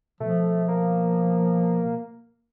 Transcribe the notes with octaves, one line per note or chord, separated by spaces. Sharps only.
B2 F3 A3
A#3